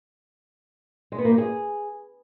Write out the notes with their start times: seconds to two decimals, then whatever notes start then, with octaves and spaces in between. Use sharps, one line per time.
1.12 G#3
1.18 B3
1.25 A#3
1.31 G4
1.38 G#4